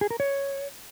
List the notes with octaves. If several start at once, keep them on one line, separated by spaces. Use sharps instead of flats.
G#4
A#4
C#5